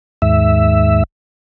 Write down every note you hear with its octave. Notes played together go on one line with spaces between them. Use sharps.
D#2 G#2 E5